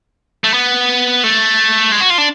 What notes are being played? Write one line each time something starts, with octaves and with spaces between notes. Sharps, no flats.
A3
B3
A3
G#3
F#4
F4
D4